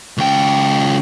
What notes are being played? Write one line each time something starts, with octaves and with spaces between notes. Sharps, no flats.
C#2 G5